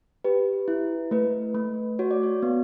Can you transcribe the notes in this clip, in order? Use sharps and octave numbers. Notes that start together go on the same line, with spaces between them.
G4 B4
E4
A3 B4
A3
F#4 C#5
D5
C#5
B3